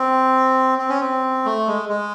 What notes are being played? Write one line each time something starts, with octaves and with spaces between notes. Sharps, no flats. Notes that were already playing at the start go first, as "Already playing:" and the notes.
Already playing: C4
C4
C#4
C4
A3
G#3
G#3